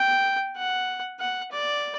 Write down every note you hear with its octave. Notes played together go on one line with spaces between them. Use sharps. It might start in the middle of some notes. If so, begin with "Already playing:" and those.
Already playing: G5
F#5
F#5
D5